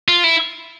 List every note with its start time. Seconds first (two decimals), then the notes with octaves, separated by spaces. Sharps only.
0.08 F4
0.24 E4